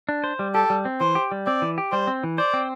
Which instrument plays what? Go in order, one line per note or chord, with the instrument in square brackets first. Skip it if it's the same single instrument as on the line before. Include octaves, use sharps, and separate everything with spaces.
[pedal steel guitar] D4
C5
G3
[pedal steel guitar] G4 [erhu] A4
[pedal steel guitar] G3
C4
[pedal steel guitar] E3 [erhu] C5
[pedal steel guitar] G4
G3
[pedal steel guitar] C4 [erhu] D5
[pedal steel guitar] E3
G4
[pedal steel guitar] G3 [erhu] C5
[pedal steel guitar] C4
E3
[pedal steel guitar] C5 [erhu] D5
[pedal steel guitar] C4